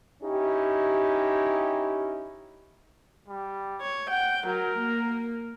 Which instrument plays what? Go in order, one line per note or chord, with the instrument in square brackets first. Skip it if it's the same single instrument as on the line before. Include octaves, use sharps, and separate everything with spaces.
[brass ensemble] C#4 D#4 E4 G4
[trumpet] G3
[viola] C#5
[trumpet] F#5 [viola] G5
[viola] F#3 [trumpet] A#4
[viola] A#3